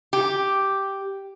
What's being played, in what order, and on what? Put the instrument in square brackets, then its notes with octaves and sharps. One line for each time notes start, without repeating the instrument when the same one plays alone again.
[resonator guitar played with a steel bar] G4